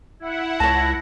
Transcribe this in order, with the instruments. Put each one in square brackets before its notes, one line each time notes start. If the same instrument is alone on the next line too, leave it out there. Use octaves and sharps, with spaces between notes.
[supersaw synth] E4 F#5
[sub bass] C#2 [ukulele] C#5 A5 [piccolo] A#6